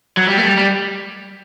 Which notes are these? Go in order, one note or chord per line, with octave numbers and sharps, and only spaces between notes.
F#3
G3
A3
G3
G3